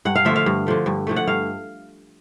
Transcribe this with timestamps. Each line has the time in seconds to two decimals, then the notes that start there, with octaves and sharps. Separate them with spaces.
0.05 G2 F#5
0.15 F5
0.25 D3 F3 A3 E5
0.36 F5
0.46 G2
0.67 D3 F3 A3
0.86 G2
1.07 D3 F3 A3
1.16 F#5
1.27 G2 F5